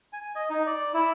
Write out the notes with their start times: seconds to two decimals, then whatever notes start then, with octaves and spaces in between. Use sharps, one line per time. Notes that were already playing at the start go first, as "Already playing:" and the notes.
0.13 G#5
0.35 D#5
0.50 D#4
0.67 D5
0.94 E4